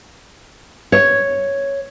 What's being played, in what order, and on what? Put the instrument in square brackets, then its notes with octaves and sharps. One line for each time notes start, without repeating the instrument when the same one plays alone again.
[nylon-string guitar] C#5